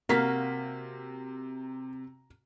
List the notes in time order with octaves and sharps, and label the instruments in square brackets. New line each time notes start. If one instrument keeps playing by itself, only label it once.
[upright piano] C3 [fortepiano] A#3 [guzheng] F#4 F5 [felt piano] A#5 B6